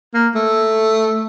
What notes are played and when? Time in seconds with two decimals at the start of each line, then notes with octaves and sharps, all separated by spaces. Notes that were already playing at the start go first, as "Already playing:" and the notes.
0.14 A#3
0.35 A3